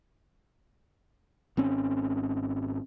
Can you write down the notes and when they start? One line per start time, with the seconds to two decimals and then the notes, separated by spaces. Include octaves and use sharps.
1.57 G#1 C4 C#4